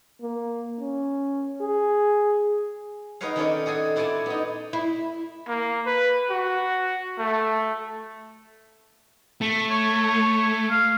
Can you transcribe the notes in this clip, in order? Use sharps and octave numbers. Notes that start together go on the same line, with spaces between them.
A#3
C#4
G#4
D#4 F#4 A#4 B4 C#5 F5
D#3 C4 C#4 A4 C#5 D5
F#4 G#4 A4 G#5
A#2 E4 D5 F#5 G#5 A5
B3 D#4
E4
A#3
B4
F#4
A3
A3
C#5
F5